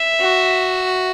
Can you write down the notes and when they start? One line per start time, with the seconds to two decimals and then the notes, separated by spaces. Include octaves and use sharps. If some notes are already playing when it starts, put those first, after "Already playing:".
Already playing: E5
0.20 F#4